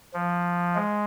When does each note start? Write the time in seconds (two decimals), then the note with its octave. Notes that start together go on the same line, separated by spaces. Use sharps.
0.14 F3
0.75 G#3